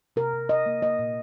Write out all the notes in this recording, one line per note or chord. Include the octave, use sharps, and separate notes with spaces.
C3 A#4
C3
C3 D#5
A#3
A#3 D#5
A#2